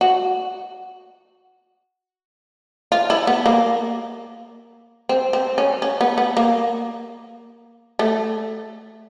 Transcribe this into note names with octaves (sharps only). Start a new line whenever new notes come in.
F#4
F4
E4
B3
A#3
C4
C4
C#4
C#4
B3
B3
A#3
A3